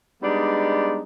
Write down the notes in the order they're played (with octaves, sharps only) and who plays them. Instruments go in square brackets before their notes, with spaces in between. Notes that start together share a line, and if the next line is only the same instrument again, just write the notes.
[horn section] G3 G#3 B3 D4 D#4